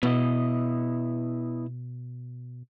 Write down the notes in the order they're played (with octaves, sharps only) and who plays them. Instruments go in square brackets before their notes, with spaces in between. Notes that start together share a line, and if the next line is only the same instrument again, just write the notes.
[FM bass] B2 [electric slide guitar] B3 E4 D#5